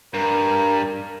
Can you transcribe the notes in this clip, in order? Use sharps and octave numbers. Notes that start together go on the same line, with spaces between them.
G2 A#4